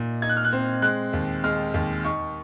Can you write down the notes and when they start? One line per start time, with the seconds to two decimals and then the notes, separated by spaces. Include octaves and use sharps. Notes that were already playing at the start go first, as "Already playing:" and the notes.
Already playing: A#2 D#4
0.22 D#4 G#6
0.30 F#6
0.37 F6
0.45 F#6
0.53 C4
0.82 G#3 F#6
1.13 D#2
1.44 G#3 F6
1.74 D#2
2.04 D#4 C#6